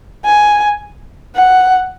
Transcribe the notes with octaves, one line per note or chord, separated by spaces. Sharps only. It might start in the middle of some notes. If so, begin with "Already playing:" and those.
G#5
F#5